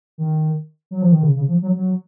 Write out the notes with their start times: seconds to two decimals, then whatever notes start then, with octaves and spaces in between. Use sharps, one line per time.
0.18 D#3
0.91 F#3
1.02 F3
1.12 D#3
1.23 C#3
1.35 C#3
1.48 F3
1.62 F#3
1.75 F#3